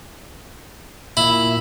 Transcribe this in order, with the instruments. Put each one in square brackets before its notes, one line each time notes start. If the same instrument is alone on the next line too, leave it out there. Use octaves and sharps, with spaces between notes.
[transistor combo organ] A#2 [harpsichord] E4